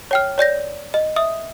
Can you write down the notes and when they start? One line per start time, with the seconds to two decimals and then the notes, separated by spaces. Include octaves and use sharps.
0.11 C#5 G5 F6
0.38 C#5 D5 G6 A#6
0.94 D#5
1.16 E5 D#6